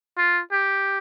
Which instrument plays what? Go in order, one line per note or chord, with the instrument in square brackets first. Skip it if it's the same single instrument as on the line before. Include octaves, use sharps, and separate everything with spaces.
[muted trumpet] F4
G4